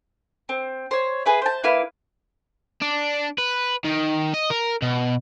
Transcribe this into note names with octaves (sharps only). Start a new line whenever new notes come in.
C4
C5 C#5
G#4 B4 E5
C5 A5
A#3 E4 B4 F6
D4
B4
D#3
D#5
A#4
B2